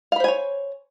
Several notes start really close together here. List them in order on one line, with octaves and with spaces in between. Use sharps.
F5 B5 C5 G#5 C#5